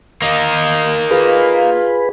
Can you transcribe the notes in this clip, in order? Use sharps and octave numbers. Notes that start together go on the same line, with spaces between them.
A#3 D#4
F4 G#4 B4